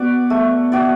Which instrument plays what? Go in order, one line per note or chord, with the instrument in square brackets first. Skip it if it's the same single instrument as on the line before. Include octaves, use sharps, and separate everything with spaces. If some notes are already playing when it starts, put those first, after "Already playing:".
Already playing: [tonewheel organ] B3 [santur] F#4 D5
[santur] A3
F#4 D5